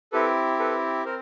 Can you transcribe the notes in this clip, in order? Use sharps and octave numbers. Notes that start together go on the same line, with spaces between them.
C4 E4 G4 A4 B4
A4 B4
C4 A#4 C5